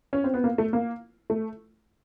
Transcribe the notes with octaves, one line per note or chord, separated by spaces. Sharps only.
C#4
C4
B3
A#3
A3
A#3
A3